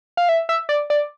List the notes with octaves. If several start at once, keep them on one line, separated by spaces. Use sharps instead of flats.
F5
E5
E5
D5
D5